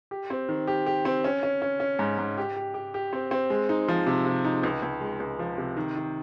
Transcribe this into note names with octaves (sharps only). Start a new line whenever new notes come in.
G4
C4
D#3
G4
G4
C4
C#4
C#4
C#4
C#4
G#2
G#2
G4
G4
G4
G4
C4
C4
G#3
D#4
F3
C3
C3
D#4
C#2
C#2
G#3
C#2
F3
C3
D#3
D#3